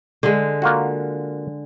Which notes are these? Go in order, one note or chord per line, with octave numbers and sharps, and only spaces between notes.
D3 G#3
A#3 F4 F#4